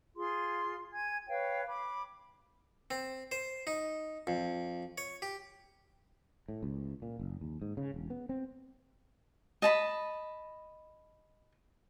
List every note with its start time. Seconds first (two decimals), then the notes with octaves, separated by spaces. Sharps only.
0.16 F4 G#4 C6
0.93 G#5 G#6
1.28 B4 C#5 F5 G5
1.68 B5 D6
2.91 C4
3.32 C5
3.67 D#4
4.27 F2
4.98 C#5
5.22 G4
6.48 A2
6.63 C#2
7.02 A#2
7.19 F#1
7.41 D#2
7.62 G#2
7.77 C#3
7.94 E1
8.10 B3
8.29 C4
9.62 D#5 A5 B5